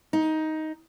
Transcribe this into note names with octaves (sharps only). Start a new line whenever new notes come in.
D#4